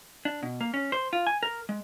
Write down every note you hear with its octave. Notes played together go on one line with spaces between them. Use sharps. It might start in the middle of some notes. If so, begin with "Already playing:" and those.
D4
B2
A#3
C#4
C5
F4
G#5
A#4
G#3